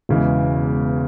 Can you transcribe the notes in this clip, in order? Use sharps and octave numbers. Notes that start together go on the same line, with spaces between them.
E1 E2 C#3 E3 G#3